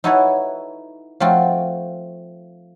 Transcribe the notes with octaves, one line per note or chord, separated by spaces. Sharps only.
D#4 E4 F#4 A4 B4 C#5
F3 A3 C4 F4 F#4